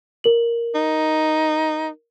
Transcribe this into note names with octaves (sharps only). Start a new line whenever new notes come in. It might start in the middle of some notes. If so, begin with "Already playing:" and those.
A#4 F#7
D#4